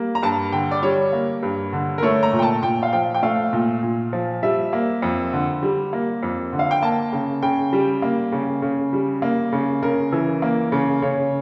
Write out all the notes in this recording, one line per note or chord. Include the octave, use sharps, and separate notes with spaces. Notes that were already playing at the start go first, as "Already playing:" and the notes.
Already playing: G3 A#3
A#5
G2 A5
D3 G5
D5
G3 C#5
A#3
G2
D3
A#4
A3 C#5
A#5
A#2
G5
A5
A#2 G5
F5
F3 G5
G5
A3 F5
A#2
A#2
F3
G3 E5
A#3
F2
D3
G3
A#3
F2
D3
F5
G5
A#3 A5
C#3
C#3 G5
G3
A#3
C#3
C#3
G3
A#3
C#3
C#3 A#4
E3
A#3
C#3
C#3 C#5